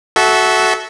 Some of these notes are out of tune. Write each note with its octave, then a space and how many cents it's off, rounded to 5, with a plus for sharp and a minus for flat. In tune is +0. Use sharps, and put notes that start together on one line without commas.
F#4 +5 A4 -20 E5 -10